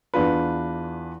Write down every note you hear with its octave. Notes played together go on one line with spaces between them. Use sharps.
E2 D4 F4 B4